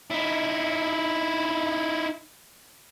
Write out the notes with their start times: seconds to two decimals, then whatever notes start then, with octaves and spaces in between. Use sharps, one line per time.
0.10 D#4 E4